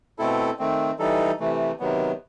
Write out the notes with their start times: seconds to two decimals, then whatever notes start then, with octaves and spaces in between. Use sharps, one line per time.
0.19 B2 A3 C4 E4 A4
0.59 D#3 A3 C4
0.99 E3 G3 D#4 A4
1.40 C3 E3 A3
1.79 C3 D#3 F#3 B3